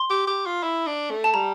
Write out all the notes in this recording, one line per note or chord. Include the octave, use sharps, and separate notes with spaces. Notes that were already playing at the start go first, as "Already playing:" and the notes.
Already playing: C6
G4
G4
F4
E4
D4
A3
A5
G3 A#5